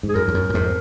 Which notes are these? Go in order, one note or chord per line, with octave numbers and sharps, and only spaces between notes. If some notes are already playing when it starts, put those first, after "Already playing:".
G#2
G#4
F#2 A#4
F2
F#2
F#2
F2 G#2